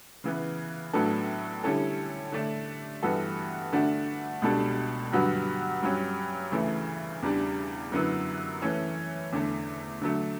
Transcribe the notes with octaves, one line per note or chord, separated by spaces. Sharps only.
C#3 E3 B3
A2 F#3 B3 D4 A4
D3 G3 C#4 E4 A4
D3 A3 D4
G2 E3 B3 F#4 A4
D3 A3 D4 F#4
C#2 B2 G3 D4 A4
G2 D3 F#3 B3 F#4
G2 F#3 C#4
D2 C#3 E3 A3
E2 C#3 G3 D4
F#2 D3 F#3 B3 E4
E3 A3 C#4
E2 D3 A3
D3 F#3 A3